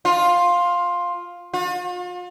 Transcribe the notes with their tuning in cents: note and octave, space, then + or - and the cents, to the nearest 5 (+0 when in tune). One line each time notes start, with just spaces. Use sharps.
F4 +10
F4 +40